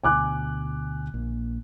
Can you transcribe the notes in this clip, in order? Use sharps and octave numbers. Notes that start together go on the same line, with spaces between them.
D2 B2 G#5 D6 F#6
A#1 A#3